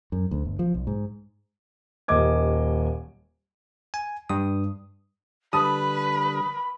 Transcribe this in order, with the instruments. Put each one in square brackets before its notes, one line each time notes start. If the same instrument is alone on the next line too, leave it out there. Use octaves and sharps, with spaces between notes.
[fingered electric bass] F#2
D2
G1
F3
B1
G#2
[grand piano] D#1 D#2 A#3 D#5 D6 G#6
[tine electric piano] G#5
G2 D#6
[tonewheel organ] D3 G3 [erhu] B4 [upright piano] A5 D#6 [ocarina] B5